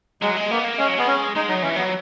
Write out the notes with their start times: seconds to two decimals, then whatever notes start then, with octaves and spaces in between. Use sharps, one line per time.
0.22 F#3 G#3
0.37 G#3
0.51 A#3 B3
0.64 A#3
0.78 G#3 C#4
0.88 F#3
0.98 G#3 B3
1.07 C#4
1.35 G#3 D#4
1.49 F#3 D#4
1.62 E3 C#4
1.76 F#3 B3